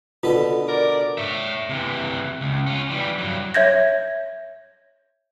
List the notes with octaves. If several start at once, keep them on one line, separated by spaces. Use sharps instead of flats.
B2 D3 F4 A4
A#4 D5
C#5 E5
C3 E3
C#2
C#4 F4
E3 G3
G2 F#3
C#5 E5 G6 G#6 A#6